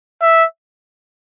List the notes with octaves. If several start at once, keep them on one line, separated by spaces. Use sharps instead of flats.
E5